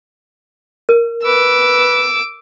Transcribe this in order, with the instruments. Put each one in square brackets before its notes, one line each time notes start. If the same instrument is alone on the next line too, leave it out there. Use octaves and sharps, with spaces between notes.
[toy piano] A#4
[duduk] B4 [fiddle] D6 E6